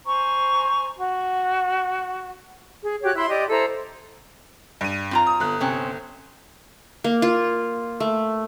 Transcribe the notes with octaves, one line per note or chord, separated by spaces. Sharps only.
C5 G#5 A#5 C#6
F#4
G#4
F#4 G4 C#5 F#6
E4 E5 B5 C6
G4 D5 D#5
E4 A4 C5 A#5
G2 D#7
C4 F4 A#5
D#6
G1 F#6
C3 C4 C#4
A#3
F4
A3